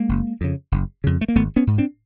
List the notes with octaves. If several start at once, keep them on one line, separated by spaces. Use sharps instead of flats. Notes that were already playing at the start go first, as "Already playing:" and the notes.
Already playing: G#3 A#3
F#1
F2 C#3
F#1
F2 C#3
A3
A#3
G#1 A3 B3
B3 C#4
G#2
C4 D4